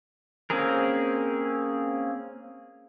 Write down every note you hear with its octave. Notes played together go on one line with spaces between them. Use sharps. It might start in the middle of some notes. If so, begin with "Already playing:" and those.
A#3 C4 C#4 G#4 A#4